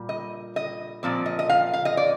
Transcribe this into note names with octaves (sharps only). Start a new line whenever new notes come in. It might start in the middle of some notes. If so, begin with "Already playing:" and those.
Already playing: A#2 G3
D#5
D#5
A#2 F3 C4 D5
D#5
D#5
F5
F5
D#5
D5